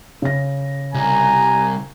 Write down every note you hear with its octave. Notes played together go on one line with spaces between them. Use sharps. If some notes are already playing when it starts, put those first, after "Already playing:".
C#3 A#6
C2 G#5 A#5